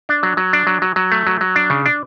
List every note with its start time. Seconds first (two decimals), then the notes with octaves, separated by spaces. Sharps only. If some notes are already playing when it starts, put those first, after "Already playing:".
0.09 D4
0.23 F#3
0.37 F#3
0.53 D4
0.67 F#3
0.82 F#3
0.96 F#3
1.12 A3
1.27 F#3
1.41 F#3
1.56 D4
1.70 C#3
1.86 D4